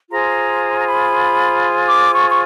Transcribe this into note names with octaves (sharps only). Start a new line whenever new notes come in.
F4 G#4 C5 A#5
A#5
B5
D6
C#6
C#6